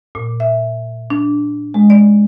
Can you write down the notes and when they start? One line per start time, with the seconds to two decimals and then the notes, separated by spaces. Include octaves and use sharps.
0.15 A#2
0.40 E5
1.10 D4
1.74 G#3
1.90 D5